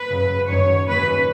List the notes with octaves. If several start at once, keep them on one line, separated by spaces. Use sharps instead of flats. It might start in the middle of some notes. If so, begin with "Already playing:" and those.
Already playing: B4
F#2 C#3 F#3
F#2 D#3 F#3 C#5
D#2 C#3 F#3 B4